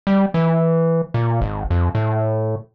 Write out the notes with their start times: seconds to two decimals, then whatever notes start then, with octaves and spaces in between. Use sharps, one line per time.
0.07 G3
0.34 E3
1.14 A#2
1.41 G#1
1.70 F2
1.95 A2